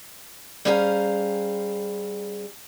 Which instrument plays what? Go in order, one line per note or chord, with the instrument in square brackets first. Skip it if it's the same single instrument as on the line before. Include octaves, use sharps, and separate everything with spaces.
[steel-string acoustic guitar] G3 C#4 G#4 C5 F5 A#5